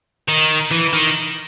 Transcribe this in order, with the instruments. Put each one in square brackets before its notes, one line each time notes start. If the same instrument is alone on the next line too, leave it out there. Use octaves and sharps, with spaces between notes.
[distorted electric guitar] D#3
E3
D#3